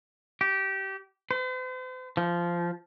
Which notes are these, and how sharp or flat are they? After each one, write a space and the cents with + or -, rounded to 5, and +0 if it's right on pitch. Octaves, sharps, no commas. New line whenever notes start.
G4 -20
C5 -45
F3 -15